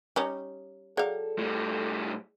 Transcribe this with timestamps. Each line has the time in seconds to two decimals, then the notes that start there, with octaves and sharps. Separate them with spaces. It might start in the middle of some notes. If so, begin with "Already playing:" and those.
0.16 G3 C#4 D#4
0.97 F#3 G#4 A4 D5 F5 G5
1.38 A2 G3